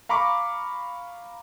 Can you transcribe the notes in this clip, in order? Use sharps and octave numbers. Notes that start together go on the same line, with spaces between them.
F5 A#5 B5 C#6 D6